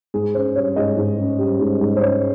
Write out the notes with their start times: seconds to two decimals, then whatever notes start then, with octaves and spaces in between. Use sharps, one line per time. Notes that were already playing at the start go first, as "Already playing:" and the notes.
0.14 G#2 G#4
0.35 C#4 C5
0.55 G3 C#5
0.76 G#2 D#5
0.97 G#2
1.18 C#4
1.39 G3
1.60 G#2
1.81 G#2
1.96 C5
2.01 C#4 C#5